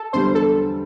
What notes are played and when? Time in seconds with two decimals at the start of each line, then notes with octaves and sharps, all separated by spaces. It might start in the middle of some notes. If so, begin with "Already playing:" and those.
Already playing: A4
0.13 E2 D3 G3 C5
0.35 A4